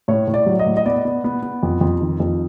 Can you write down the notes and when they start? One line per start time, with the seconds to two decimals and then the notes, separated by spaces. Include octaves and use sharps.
0.08 A2 C#5
0.27 A2
0.34 D5
0.46 F#3
0.59 D#5
0.66 A2
0.77 D#5
0.85 B3 D5
1.05 B3
1.24 B3
1.42 B3
1.63 F2
1.81 F2
2.01 D#3
2.20 F2